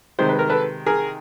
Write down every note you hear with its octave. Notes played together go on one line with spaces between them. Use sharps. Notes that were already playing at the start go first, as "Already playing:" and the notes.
C3 D#3 G#3 C5
B4
A#4
A4 B4
G#4 A#4